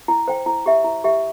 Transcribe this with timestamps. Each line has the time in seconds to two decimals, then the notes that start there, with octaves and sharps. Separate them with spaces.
0.08 E4
0.28 C5 G5
0.46 E4
0.66 G4 E5
0.84 E4
1.04 G4 E5